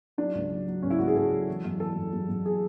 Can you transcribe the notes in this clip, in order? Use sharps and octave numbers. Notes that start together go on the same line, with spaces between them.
F#3 D4
C#2
F#3
F#3
C#2 C#4
E4
C#2 F#4
G#4
C#2 A4
F#3
E3
F#2
E3 A4
F#2
F#2
F#2
G#4